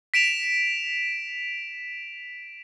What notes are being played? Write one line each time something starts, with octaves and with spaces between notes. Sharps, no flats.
B6 D7 E7 F7